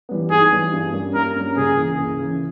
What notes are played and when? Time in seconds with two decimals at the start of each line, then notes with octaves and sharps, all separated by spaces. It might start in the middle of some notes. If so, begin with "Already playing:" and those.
0.09 E3 G3 B3
0.31 G#2 G#4
0.52 E3 G3 B3
0.72 G2
0.93 G3 A#3 C#4
1.14 G2 A#4
1.35 G3 A#3 C#4
1.57 C#2 G#4
1.77 C#3 E3 A#3
1.99 C#2
2.19 C#3 E3 A#3